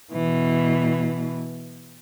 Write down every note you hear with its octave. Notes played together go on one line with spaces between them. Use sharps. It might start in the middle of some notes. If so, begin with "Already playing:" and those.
B2 E3